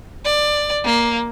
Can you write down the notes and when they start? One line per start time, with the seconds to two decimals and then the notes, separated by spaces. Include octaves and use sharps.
0.25 D5
0.85 A#3